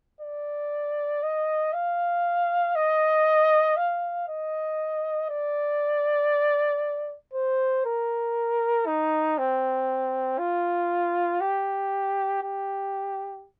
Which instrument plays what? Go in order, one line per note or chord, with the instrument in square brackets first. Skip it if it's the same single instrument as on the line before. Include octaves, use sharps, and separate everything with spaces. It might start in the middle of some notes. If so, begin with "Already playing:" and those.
[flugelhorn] D5
D#5
F5
D#5
F5
D#5
D5
C5
A#4
D#4
C4
F4
G4
G4